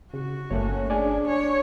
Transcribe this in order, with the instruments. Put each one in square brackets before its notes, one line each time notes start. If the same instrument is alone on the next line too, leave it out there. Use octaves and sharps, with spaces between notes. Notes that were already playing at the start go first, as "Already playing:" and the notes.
[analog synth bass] C#3 [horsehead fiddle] F#4
[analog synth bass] G1 [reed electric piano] A3 A#3 C#5 [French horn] C#4
[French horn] D4 [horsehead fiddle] G#4 [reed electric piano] D5 G#5
[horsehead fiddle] C#5